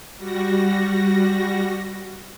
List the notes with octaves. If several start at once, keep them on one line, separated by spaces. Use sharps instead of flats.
G3 F#4 A#6